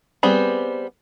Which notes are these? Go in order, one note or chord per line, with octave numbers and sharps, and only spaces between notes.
G3 B3 C4 G#4 B5